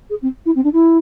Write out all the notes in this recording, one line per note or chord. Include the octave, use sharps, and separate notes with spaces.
G#4
C4
E4
C4
D4
E4